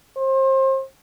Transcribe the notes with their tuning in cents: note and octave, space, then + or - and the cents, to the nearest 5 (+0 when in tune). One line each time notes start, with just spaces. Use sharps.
C5 +30